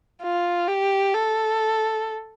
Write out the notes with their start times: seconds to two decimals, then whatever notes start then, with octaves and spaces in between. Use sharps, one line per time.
0.22 F4
0.68 G4
1.14 A4